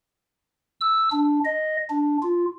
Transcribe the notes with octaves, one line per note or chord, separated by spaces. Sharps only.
E6
D4
D#5
D4
F4